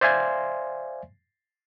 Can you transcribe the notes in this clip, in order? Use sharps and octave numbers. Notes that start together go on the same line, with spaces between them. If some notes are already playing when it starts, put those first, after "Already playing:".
C5 D5 E5 F5 G#5 C6